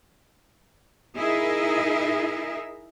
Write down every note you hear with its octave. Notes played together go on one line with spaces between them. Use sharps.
D#4 E4 G#4 A#4 D#5 E5